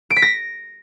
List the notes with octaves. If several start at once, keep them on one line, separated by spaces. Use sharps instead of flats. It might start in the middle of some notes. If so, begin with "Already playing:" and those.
D7
B6
A#6